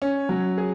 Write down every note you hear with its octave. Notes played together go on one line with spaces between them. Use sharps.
C#4
F#3
G#4